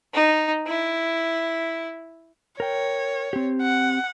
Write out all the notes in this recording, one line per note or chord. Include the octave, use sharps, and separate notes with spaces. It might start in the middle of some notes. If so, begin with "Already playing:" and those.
D#4
E4
A#4 C#5 G5
C4 G4
F#5